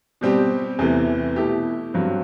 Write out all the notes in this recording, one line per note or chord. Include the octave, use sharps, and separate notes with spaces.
B2 G3 C4 G4
E2 C3 E3 A3
B2 A3 E4 G4
G2 F#3 C4